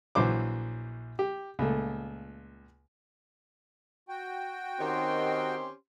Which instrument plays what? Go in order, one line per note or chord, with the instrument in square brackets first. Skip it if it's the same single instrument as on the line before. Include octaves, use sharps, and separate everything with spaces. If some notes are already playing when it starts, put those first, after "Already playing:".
[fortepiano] A#1 E3 F#3 C5 D6
G4
C#2 A#2 A3
[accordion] F#4 G5
[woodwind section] D#3 [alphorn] C4 [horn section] C#4 G4 C6